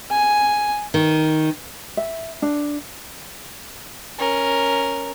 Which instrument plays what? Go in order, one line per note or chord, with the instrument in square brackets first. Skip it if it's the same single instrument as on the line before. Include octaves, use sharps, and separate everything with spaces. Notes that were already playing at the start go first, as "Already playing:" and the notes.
[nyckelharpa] G#5
[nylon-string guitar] D#3
[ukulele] E5
D4
[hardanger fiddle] C#4 A#4